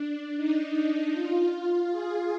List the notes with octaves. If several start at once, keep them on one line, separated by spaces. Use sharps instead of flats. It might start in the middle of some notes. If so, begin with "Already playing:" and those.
Already playing: D4
D#4
D#4
F4
G#4